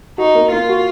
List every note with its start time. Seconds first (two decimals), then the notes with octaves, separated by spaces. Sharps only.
0.18 D#4 F#4
0.35 A#3
0.51 A#3 F4
0.69 F#4